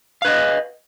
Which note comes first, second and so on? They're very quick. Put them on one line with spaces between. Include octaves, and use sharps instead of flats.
F5 B4 D#5